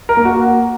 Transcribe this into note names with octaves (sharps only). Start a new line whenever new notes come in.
A#4
A#3
F#4